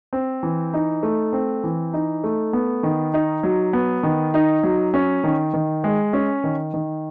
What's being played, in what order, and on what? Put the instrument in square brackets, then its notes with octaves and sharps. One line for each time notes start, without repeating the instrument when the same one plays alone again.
[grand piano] C4
E3
D#4
A3
C4
E3
D#4
A3
B3
D#3
D#4
F#3
B3
D#3
D#4
F#3
C#4
D#3
D#3
G#3
C#4
D#3
D#3